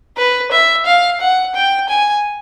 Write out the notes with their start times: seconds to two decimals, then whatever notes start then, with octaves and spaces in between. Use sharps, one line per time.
0.17 B4
0.51 E5
0.85 F5
1.20 F#5
1.55 G5
1.89 G#5